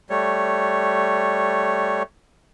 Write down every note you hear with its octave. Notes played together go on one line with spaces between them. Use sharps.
G3 A3 C#5